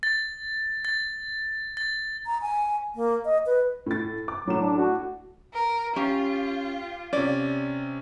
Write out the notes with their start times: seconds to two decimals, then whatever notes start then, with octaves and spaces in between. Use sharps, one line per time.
0.03 A6
0.85 A6
1.77 A6
2.26 A#5
2.42 G#5
2.95 A#3
3.25 D#5
3.46 B4
3.86 A2 A6
4.28 D6
4.47 A2 F#3 E7
4.61 D4
4.78 F#4
5.53 A#4
5.96 C#4 F4 G4
7.13 C3 C#4 D5